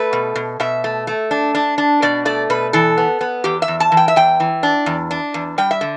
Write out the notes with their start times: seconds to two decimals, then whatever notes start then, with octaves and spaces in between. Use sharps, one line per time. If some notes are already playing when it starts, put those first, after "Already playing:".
Already playing: A3 B4
0.13 B2
0.36 B2
0.60 B2 E5
0.84 A3
1.07 A3
1.31 D4
1.55 D4
1.78 D4
2.02 B2 D5
2.25 A3 D5
2.50 B2 B4
2.73 E3 A4
2.98 B3
3.21 B3
3.44 E2 G4
3.62 E5
3.68 E2
3.80 A5
3.92 E3
3.97 G5
4.08 E5
4.16 E2 G5
4.40 E3
4.63 D4
4.86 E2
5.11 D4
5.34 E2
5.58 G3 G5
5.71 E5
5.81 D3